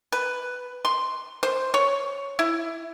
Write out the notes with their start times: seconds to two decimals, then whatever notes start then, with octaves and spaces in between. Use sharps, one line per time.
0.12 B4
0.85 C6
1.43 C5
1.74 C#5
2.39 E4